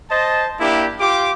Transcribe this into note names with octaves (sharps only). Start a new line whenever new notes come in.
C5 D#5 A5
A#3 D4 E4 G4
F4 G4 D6